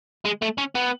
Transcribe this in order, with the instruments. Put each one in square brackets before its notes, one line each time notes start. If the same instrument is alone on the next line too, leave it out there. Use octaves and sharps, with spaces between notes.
[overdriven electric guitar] G#3
A3
C#4
B3